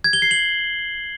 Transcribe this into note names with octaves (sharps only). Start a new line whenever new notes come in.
G#6
G7
C7
F#7